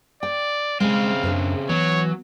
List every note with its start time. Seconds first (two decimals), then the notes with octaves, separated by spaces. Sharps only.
0.23 D5 G5
0.80 C#3 G#3 C4 F5
1.23 F#2 D4 G#4 B4
1.69 E3 F#3 B3 C#5